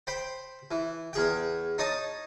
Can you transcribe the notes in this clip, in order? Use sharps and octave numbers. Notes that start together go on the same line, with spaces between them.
C5 G5 B5
E3
E2 G#4 G5
D#4 C#5 D#5 A5 D#6